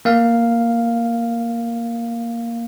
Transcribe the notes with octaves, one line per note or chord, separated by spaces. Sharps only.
A#3 F5